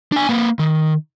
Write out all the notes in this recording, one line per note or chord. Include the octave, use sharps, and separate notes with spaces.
D4 G#5
A#3 B4
D#3